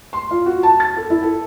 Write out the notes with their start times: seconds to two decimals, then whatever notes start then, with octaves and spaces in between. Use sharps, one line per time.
0.13 C6
0.31 F4
0.46 F#4
0.63 A5
0.80 A6
0.97 A4
1.10 E4
1.23 A4